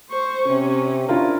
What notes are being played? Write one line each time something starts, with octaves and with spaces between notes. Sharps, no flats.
C5 C#6
C3 C#4
D4 E4 F4 A#4